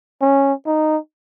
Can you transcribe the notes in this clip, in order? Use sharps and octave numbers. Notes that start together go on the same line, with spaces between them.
C#4
D#4